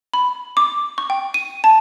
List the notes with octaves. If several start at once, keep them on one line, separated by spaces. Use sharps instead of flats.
B5
D6
C#6
G5
D#7
A5